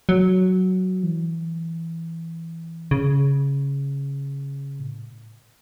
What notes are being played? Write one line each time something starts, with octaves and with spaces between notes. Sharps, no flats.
F#3
E3
C#3
A2